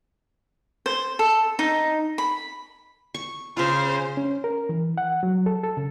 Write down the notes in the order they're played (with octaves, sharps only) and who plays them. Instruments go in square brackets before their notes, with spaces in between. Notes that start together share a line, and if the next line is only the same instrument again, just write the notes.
[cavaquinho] C5
A4
D#4
B5
[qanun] C#6
[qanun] C#3 F4 [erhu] C5
[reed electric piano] C#4
A#4
E3
F#5
F#3
A4
A4
C#3